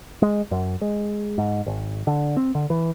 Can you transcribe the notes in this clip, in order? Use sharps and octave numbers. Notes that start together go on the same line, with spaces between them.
G#3
F#2
G#3
G#2
G#1
D3
C4
D3
E3